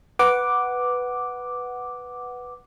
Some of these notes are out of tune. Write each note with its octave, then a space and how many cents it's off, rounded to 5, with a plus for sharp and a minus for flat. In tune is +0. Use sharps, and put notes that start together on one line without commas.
B4 +5 F#5 +0 D6 +0